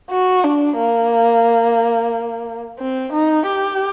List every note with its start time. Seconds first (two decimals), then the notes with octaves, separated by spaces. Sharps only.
0.11 F#4
0.44 D4
0.78 A#3
2.79 C4
3.12 D#4
3.46 G4